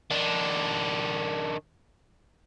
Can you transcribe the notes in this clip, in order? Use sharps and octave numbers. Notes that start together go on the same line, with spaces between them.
D#3 D4